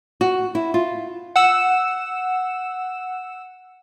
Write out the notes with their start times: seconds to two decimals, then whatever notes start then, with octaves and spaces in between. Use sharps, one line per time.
0.21 F#4
0.55 E4
0.74 F4
1.36 F#5 E6 E7